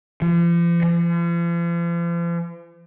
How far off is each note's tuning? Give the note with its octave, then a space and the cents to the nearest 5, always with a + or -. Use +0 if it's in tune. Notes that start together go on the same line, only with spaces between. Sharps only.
F3 -40
F3 -45